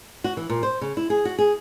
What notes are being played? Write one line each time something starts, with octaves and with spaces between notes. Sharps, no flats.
F#4
E3
A#2
C5
C#3
E4
G#4
F#4
G#4